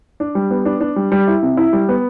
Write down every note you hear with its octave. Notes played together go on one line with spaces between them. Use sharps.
D4
G3
B3
D4
D4
G3
G3
E4
C3
E4
G3
B3